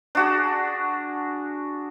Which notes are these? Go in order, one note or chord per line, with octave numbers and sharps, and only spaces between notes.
D4 F#4 G#4